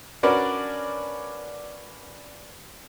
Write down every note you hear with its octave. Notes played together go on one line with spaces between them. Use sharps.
C#4 D4 F#4 A#4 B4 D5